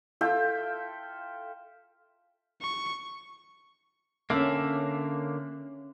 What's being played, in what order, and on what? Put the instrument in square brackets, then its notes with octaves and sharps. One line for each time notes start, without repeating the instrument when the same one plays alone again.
[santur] F4 A4 E5 G5
[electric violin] C#6
[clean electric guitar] D3 A#3 [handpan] C#4 E5